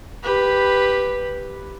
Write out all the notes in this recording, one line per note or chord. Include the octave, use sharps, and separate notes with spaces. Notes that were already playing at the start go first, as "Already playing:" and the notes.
G4 B4